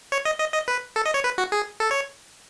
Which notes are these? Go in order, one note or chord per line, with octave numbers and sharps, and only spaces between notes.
C#5
D#5
D#5
D#5
B4
A4
D#5
C#5
B4
F#4
G#4
A4
C#5